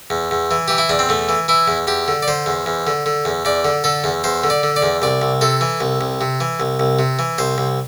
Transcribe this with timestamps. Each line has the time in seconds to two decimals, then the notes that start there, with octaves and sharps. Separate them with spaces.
0.10 E2
0.31 E2
0.51 E3
0.68 E3 G4
0.78 E4
0.89 E2 D4
0.99 C4
1.09 E2 A3
1.29 E3
1.48 E3 E4
1.68 E2
1.87 E2 G4
2.08 D3
2.22 D5
2.28 D3 C5
2.46 E2
2.66 E2
2.87 D3
3.06 D3
3.25 E2
3.45 E2 D5
3.65 D3
3.84 D3 A4
4.04 E2
4.24 E2 C5
4.44 D3
4.50 D5
4.63 D3
4.76 D5
4.82 E2
5.02 C2 D5
5.22 C2
5.41 C3 A4
5.61 E3
5.81 C2
6.01 C2
6.21 C3
6.40 E3
6.60 C2
6.80 C2
6.99 C3
7.19 E3
7.38 C2 C5
7.58 C2